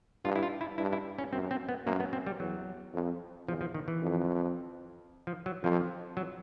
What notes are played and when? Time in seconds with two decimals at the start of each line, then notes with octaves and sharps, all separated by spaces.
0.25 G2 F4
0.36 E4
0.43 F4
0.61 E4
0.78 G2 E4
0.93 E4
1.18 C#4
1.32 F#2 C4
1.51 C4
1.69 B3
1.86 F#2 A#3
2.00 B3
2.13 C4
2.27 G3
2.40 E2 F#3
2.94 F2
3.48 E2 F3
3.61 F3
3.74 D#3
3.88 E3
4.02 F2
5.27 F3
5.46 F#3
5.63 F2 F3
6.17 F#3